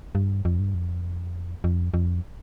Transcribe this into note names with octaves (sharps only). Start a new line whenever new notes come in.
G2
F2
G2
F2
F2
F2